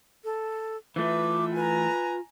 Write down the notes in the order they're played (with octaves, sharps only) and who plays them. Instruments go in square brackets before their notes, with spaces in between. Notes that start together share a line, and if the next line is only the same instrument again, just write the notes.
[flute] A4
[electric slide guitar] E3 A3 [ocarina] F4 [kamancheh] B4 E5 [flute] D6
[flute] B4 [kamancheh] G#5 A#5